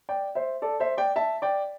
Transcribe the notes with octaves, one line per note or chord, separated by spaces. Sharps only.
D5 G5
C5 E5
A4 D5
C5 E5
D5 G5
E5 A5
D5 G5